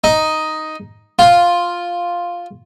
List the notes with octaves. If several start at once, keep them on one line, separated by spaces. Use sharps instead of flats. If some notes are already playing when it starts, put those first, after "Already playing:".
D#4
F4